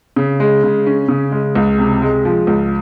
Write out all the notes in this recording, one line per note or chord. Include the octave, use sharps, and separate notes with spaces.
C#3
G#3
C#3
C#4
C#3
G#3
C#2
C3
G#3
F3
C#2